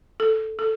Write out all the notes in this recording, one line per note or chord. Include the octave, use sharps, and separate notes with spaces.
A4
A4